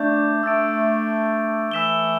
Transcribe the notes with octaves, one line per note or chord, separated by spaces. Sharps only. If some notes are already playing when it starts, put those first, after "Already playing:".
Already playing: A3 D4 D6 G6
A3 D4 E6 A6 D7
E3 A3 E6 B6 E7 G7